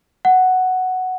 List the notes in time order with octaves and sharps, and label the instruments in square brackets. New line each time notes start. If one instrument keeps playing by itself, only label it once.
[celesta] F#5